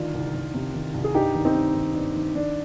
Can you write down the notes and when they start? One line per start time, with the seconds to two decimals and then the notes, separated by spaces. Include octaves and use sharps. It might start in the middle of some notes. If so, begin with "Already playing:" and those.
Already playing: D2 D#3 D4 F4
0.14 C2
0.34 C2
0.54 C3
0.74 D#3
0.94 C2
1.04 G#4
1.14 G2 D#4 G4
1.35 D#3
1.45 C4 D#4
1.55 G2
1.75 D#3
1.95 G2
2.15 D#3
2.35 D#3 D4